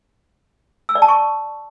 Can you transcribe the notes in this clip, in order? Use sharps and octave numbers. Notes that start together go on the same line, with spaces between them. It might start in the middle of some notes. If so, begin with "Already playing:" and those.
E6
D5
A5
C#6